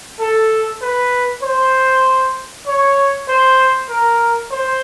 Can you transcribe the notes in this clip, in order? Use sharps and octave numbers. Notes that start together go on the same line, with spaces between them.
A4
B4
C5
C#5
C5
A#4
C5